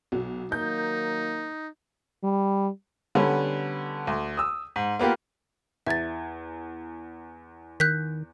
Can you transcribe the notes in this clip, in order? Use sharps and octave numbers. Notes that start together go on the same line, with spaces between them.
B1 F#3
D#3 F#3 A#3 D#4 G6
G3
D3 G3 B3 C#4
D2
D#6 E6
G#2
A#3 B3 F4 G4
E2 E5 G#6 A6
D#3 F#6 G6 B6